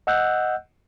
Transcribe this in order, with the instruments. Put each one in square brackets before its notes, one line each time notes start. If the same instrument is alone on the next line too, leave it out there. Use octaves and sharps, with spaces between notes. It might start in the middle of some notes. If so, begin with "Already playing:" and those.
[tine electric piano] D#5 F#5 E6 F#6 G6